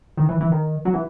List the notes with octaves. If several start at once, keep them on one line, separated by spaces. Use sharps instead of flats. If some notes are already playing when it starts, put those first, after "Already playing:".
D#3
E3
E3
D#3
F#3
E3